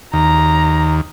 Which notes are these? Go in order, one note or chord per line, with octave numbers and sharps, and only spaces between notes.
D#2 A#5